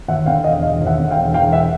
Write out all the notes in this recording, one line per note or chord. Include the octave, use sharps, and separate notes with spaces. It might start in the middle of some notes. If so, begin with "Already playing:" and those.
D#2 E5 F#5
D3 F5 G5
E1 D#5 F5
E1 D#5 F5
D#2
E5 F#5
D3
F5 G5
E1
E1 F5 G5
E5 F#5